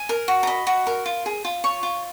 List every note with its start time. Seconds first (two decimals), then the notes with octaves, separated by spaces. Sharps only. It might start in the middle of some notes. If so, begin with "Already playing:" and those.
Already playing: G#5
0.09 A#4
0.28 F#4
0.43 A#5
0.47 D#5 B5
0.67 F#4
0.87 A#4
1.06 F4
1.26 G#4
1.45 F4
1.64 C#5 C#6
1.83 F4